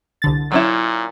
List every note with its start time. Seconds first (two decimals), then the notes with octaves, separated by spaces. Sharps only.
0.22 C2 D3 A6
0.52 A#2 F#3 C#4 E4